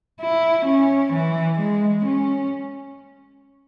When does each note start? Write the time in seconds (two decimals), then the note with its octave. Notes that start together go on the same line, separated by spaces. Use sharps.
0.20 E4
0.67 C#4
1.13 E3
1.60 G#3
2.06 C#4